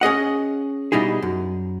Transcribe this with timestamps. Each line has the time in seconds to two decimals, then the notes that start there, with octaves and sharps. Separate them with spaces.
0.01 C#4 G#4 D#5 F#5
0.92 B2 G3 D#4 E4 G#4
1.22 F#2